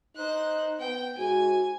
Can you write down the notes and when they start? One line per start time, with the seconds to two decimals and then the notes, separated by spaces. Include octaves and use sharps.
0.16 D#4 C5 F#6
0.80 B3 G5
1.18 G#2 F#4 G#5